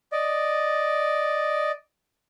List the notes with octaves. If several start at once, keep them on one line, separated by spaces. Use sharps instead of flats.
D5 D#5